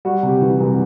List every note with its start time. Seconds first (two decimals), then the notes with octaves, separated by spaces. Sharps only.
0.05 G3 F#4
0.23 C3
0.29 G4
0.41 E3
0.60 C2